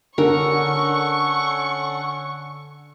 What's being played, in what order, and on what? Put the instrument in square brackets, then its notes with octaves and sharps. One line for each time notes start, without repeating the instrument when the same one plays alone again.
[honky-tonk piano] D3 [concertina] C#4 A4 F#5 [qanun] A#4 [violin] C#6